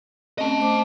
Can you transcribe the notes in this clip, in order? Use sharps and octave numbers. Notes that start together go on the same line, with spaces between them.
A3 C4 C#4 D#5 A5
A3 C5 D6